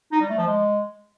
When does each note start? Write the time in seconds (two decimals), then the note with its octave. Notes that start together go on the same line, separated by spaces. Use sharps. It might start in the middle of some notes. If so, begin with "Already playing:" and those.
0.12 D#4
0.21 G3
0.29 A3
0.38 F3
0.46 G#3